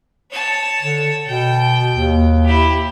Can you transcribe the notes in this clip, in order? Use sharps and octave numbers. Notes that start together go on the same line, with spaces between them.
C#5 A5
D3
B2 G5
D#2
E4 G4